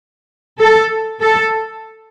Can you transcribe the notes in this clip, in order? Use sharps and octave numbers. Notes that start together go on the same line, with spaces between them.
A4
A4